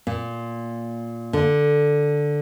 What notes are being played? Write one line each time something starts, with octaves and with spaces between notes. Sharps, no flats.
A#2
D3